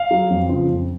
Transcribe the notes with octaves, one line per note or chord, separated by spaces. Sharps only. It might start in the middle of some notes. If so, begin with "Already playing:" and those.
Already playing: F5
F#3
F2
C#3 F3
F2